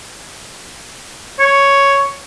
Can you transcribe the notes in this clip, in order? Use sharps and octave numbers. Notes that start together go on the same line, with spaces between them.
C#5